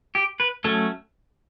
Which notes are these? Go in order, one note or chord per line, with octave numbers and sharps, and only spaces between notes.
G4
B4
F#3 A3 C#4 A4